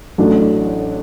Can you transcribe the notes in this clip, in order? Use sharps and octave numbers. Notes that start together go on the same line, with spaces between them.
A1 A2 F#3 A3 D4